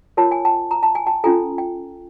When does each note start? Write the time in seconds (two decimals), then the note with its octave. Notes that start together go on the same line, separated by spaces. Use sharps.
0.17 F4 A#4 C#5 A5
0.31 G#5
0.45 G5 A5
0.71 A#5
0.83 A5
0.95 G#5
1.07 G5 A5
1.24 C#4 F4 A4 G#5 A#5
1.58 G5